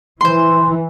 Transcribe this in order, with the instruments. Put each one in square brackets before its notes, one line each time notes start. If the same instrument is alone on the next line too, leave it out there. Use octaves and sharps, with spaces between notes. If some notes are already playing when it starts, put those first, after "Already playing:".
[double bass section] E3 [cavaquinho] C5 C6